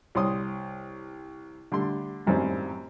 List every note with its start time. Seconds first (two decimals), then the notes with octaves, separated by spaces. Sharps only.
0.15 C2 C#5 C6 D#6
1.72 D3 G3 A3 C6
2.27 G#1 F#2 A2 G3 C4